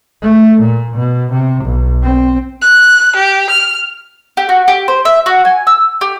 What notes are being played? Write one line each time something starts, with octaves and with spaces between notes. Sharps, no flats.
A3
A#2
B2
C3
B1
C4
F#6
G4
F6
G4
F#4
G4
C5
E5
F#4
G#5
E6
G4